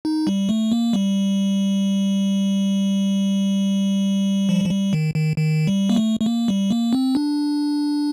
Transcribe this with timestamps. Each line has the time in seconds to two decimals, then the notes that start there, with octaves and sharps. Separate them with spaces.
0.05 D#4
0.27 G3
0.49 A3
0.72 A#3
0.93 G3
4.49 F3
4.66 F3
4.71 G3
4.93 D#3
5.15 D#3
5.37 D#3
5.67 G3
5.90 A#3
5.96 A3
6.20 A3
6.26 A#3
6.48 G3
6.70 A#3
6.93 C4
7.15 D4